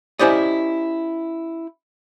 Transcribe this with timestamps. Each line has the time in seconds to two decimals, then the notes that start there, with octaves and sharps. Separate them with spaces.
0.19 C#4 E4 G4 C5 D5 D#5